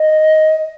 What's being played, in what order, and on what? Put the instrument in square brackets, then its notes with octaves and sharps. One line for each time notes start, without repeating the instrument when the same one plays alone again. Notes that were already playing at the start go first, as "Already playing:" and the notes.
Already playing: [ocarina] D#5